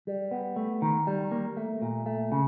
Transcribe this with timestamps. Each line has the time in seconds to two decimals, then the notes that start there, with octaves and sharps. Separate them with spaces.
0.07 G3
0.31 B3
0.56 A3
0.82 D#3
1.07 G3
1.32 A#3
1.57 A3
1.82 A#2
2.06 A3
2.32 C#3